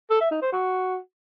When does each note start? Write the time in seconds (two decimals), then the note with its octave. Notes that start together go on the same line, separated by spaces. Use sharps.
0.10 A4
0.21 E5
0.31 D#4
0.42 C5
0.52 F#4